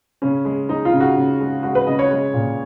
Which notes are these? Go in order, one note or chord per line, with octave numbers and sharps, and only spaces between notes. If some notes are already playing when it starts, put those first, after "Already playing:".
C#3 C#4
G#3
G#3 D#4
F4
C#3
F#4
C#3
G#3
G#3 F#4
B4
C#3 D#5
C#5
G#3
A#2